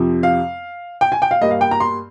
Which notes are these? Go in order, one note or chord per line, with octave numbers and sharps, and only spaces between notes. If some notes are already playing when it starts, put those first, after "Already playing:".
Already playing: F2 C3 F3
F5
G5
G#5
G5
F5
G2 G3 A#3 D#5
F5
G5
A#5
C6